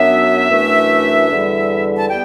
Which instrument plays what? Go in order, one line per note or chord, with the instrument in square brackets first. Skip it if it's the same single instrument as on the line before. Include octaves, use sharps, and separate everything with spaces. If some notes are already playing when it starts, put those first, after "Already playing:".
Already playing: [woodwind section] F#2 F#3 B3 D4 E5
F#2 E3 A3 D4
E2 D3 G3
A5
G3 B3 G5